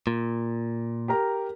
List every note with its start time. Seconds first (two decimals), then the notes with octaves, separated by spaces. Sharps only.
0.07 A#2
1.08 G4 A#4 A#5